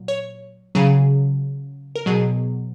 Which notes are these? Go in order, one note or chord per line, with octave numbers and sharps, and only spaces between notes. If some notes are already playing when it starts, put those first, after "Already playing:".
Already playing: A#2 F#3
C#5
C#3 F#3 G#4
A#4
B2 F#3 G#4